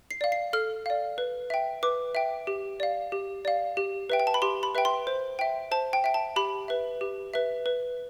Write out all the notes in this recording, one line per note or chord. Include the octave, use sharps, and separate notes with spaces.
C7
D5 F5
C7
A4 F6
D5 F5
B4
E5 G5
B4 D6
E5 G5
G4
D5 F5
G4
D5 F5
G4
B4 E5 G5
G5
A5
B5
G4 C6
B5
B4 E5 G5
C6
C5
E5 G5
C5 A5
G5
E5 G5
A5
G4 B5
B4 E5
G4
B4 E5
B4